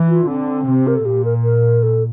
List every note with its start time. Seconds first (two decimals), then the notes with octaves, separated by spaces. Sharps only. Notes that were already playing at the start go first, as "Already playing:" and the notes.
Already playing: E3
0.08 F4
0.27 D3 C4
0.67 C3
0.87 A#4
0.95 A4
1.05 A#2 G4
1.24 A#4
1.42 A#4
1.83 A4